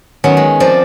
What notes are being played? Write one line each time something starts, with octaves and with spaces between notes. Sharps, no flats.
D#3 F#3 B3 C#4
G#3
F3 A#3 C4 D5